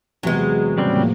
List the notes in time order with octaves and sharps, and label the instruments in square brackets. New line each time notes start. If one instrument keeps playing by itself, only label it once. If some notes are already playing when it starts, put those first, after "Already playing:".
[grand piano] E2 C3 B3 [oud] F#3 G#3
[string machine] A2 F3 A#3 [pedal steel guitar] C#3 G3 C4